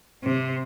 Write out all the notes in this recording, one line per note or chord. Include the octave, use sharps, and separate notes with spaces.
C3